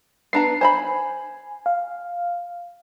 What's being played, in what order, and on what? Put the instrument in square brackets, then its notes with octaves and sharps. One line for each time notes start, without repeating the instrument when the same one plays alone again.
[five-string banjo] B3 D4 A#5 [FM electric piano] C7
[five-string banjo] C5 A#5 B5 [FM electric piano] G#5
[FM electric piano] F5